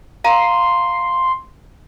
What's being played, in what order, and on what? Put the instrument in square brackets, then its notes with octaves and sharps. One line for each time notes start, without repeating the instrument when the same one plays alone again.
[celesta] F5 A#5 D#7 [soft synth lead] C6